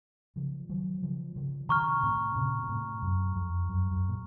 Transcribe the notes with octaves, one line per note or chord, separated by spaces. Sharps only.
C#3 F3
D#3 F#3
C#3 F3
C#3 F3
C3 D#3 A#5 C#6 F6
A2 C3
A#2 C#3
C#3
A2 C3
F#2
F2
F#2
F#2
A#2